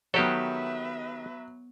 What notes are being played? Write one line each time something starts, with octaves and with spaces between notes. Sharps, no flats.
D#3 F#3 B3 G4 A4 B4 C#5 E5